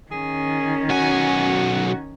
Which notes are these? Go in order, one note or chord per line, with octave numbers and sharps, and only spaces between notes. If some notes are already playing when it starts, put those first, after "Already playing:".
D#3 C#4 G#4
B1 F#4 G#5